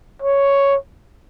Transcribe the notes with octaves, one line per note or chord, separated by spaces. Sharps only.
C#5